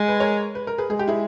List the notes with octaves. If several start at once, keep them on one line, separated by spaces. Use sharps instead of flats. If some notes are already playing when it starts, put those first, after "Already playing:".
Already playing: G#3
B4
A#4 C#5
B4
A#4
G#4 B4
G#3 G#4
G4
E4 G#4